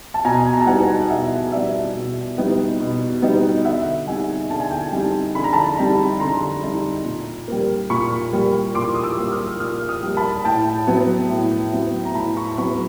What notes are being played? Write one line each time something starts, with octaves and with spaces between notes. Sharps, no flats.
A5
B2 G#5 A#5
A#5
A5
G3 B3 D#4 F#5 G#5
B2 E5 F#5
G3 B3 D#4 D5 E5
B2
G3 B3 D#4
B2
G3 B3 D#4
D3 E5 F#5
G3 C4 D#4 F#5 G#5
D3 A5
G#5
G5 A5
G3 C4 D#4
D3 B5
A#5
A5 B5
G3 C4 D#4
D3 A#5 C6
G3 C4 D#4
A#2
G3 A#3
A#2 B5 C#6
G3 A#3
A#2 C6 D6
D#6
D6 E6
G3 A#3
D#6 F6
A#2 D#6 F6
D#6 F6
G3 A#3
A5 B5
A2 G5 A5
F#3 B3
A2
F#3 B3
A#5
A2 A5 B5
B5 C#6
F#3 B3 B5 C#6